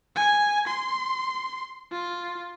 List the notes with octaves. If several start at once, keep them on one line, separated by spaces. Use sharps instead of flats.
G#5
C6
F4